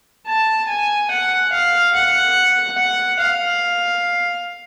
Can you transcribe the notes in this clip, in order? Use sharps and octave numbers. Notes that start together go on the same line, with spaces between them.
A5
G#5
F#5
F5
F#5
F#5
F5